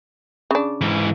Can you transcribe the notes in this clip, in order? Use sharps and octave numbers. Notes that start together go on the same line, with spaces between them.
C#3 D4
G#2 E3